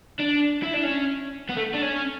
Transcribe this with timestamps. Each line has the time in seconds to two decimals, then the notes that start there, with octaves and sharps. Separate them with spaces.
0.20 D4
0.63 E4
0.74 D4
0.84 C#4
1.50 B3
1.57 A3
1.74 D4
1.83 C#4